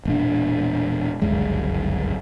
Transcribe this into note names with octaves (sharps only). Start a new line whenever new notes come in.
E1 A#2 D4
G1 C#2 F#2 G#3